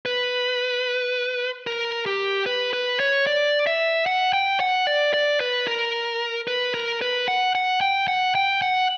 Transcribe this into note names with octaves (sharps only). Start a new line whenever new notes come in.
B4
A#4
G4
B4
B4
C#5
D5
E5
F#5
G5
F#5
D5
D5
B4
A#4
B4
A#4
B4
F#5
F#5
G5
F#5
G5
F#5